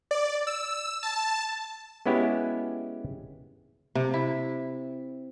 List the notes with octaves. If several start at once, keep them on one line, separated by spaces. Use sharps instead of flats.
D5
E6
A5
G#3 B3 C#4 E4 F#4 G4
C3
E4